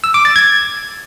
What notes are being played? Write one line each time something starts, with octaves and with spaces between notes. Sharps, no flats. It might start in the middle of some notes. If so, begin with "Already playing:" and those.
E6
D6
A6
G#6